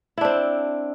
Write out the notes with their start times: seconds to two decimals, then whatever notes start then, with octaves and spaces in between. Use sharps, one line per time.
0.17 E4
0.21 D4
0.25 C4